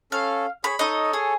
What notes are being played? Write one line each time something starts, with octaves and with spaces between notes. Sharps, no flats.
C#4 A4 F5
G#4 C#5 B5
D#4 A4 C#5 D#5
G#4